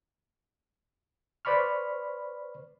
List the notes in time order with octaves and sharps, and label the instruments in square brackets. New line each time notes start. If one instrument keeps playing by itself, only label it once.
[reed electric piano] B4 C5 D5 B5 C#6 F6